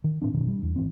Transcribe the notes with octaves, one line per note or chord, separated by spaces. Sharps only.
D#3
A2 C4 D4
G#1 F#2 B2 D#3
G3
E2
G#1 E3 C4